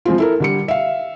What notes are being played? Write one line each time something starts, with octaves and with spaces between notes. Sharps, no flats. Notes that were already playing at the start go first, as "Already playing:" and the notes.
F3 G#3 C4 F4
E4 A4 A#4
D3 G3 C#7
E5 F5